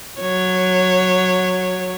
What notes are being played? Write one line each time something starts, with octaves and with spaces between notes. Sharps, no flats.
F#3 C#5